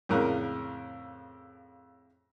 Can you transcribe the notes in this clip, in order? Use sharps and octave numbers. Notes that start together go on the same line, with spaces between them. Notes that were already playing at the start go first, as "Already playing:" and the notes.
F2 A2 C#3 C#4 A#4 F#6